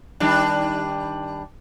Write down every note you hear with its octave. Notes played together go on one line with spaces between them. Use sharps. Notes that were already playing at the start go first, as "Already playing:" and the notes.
D#3 G3 D4